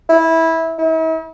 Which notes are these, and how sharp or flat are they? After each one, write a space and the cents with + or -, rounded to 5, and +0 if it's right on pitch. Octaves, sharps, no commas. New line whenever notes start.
E4 -15
E4 -45